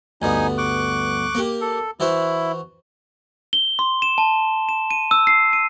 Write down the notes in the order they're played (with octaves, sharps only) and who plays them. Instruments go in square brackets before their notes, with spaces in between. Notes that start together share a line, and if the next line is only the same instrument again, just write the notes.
[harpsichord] D2 G2 B3 [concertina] D#4 G#5
[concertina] C#6 D6 F#6
[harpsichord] A#3 G4
[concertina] A4
[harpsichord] E3 F#4 C5 [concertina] E4
[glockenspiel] G7
C6
E7
A5
E7
D#7
E6
C7
D#7